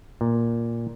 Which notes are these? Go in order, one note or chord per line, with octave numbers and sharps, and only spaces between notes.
A#2